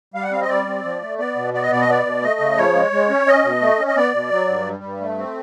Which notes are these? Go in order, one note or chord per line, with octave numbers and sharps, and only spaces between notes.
G3 F5
F#5
C4 F5
D#5
G3 D5
C4
F3
A3
B3 D5
B2
B3 D5
D#5
B2 D5
D#5
B3 D5
B2
A3 D#5
C#3
F3 C#5
G#3
G#3
C#4
C#4 D#5
B2
A3
C#4
D#5
B3 D5
B2
F#3
G2
G3
G2
A3
C4